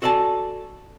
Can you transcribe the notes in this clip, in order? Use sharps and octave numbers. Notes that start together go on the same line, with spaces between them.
F#4 A4 D5 G#5 A5